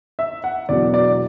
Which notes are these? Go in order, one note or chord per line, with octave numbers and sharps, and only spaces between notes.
E5
F#5
E1 E2 B2 F#3 D5
D5